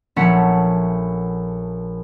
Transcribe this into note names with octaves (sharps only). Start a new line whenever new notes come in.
A#1 A3 C#4 F#5 B6